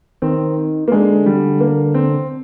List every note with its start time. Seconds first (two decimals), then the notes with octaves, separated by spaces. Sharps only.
0.22 D#3 C4
0.88 A#3
0.92 D3 G#3
1.26 G3
1.61 A#3
1.94 C4